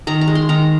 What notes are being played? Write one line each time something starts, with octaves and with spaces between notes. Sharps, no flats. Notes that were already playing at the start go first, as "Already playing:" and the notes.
D#3 A#5
A#5
G#3
C6
D#3 A#5